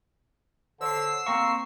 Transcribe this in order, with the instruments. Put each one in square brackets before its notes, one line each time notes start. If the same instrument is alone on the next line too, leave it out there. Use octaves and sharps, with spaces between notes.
[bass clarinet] D3 [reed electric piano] C5 C#5 [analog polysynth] E6 C7
[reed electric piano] A#3 F5 [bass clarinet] C4 [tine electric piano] A#5 C#6